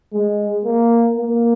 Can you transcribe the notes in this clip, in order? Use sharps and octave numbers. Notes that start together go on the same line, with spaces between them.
G#3
A#3
A#3